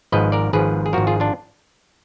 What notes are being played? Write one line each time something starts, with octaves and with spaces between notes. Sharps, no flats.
G#1 G#2 F3 B4 D#5
A#4 D5
G#1 G#2 F3 G#4 B4
G#4
G#1 G#2 F3 F#4 A#4
F4 G#4
D4 F4